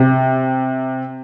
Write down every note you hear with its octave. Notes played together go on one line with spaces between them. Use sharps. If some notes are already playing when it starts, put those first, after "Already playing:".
Already playing: C3